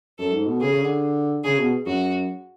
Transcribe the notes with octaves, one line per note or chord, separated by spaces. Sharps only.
F#2 A4
G#2
B2
C#3 G#4
C#3
D3
C#3 G#4
B2
F#2 F#4